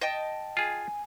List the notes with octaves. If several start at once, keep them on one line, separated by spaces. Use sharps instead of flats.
D#5 G5 A5
F4 G#4 G#5